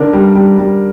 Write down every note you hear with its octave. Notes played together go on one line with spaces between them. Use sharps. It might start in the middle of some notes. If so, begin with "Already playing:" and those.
Already playing: D3 D4 A#4
G3
G3
G3